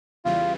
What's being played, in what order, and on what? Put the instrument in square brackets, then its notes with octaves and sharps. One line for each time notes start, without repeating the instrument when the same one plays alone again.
[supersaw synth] E2 C#3 E3 G3 [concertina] F4